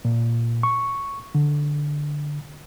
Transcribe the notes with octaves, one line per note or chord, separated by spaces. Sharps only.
A#2
C#6
D3